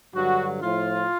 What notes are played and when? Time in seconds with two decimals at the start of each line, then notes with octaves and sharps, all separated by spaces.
0.14 G2 D3 F#3 F#4
0.61 A2 F3 F4